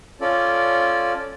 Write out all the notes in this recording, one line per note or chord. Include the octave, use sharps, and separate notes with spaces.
C#4 F4 A4 D5